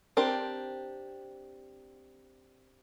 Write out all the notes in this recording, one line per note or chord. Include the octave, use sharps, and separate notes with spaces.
C4 D4 G4 A#4